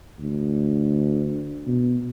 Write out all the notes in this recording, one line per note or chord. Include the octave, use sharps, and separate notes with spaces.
D2
B2